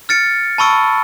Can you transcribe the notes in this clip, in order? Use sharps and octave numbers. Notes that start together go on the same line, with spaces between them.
F6 A6 C#7 D7
A5 B5 C#6 E6 D7